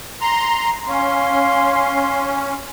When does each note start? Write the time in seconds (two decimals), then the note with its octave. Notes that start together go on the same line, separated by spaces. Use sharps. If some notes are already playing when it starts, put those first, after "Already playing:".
0.21 A#5 C6
0.88 C#4 F5 C6